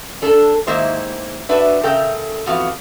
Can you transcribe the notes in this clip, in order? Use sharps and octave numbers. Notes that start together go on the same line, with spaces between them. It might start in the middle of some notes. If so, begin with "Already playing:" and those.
D4 A4
G#2 D#3 A#3 E4 G4 C5
D4 F#4 B4 D5 E5
C#3 A4 A#4 E5 G5
F2 E3 B3 F#4 F5